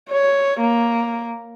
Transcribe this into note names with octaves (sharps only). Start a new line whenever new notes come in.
C#5
A#3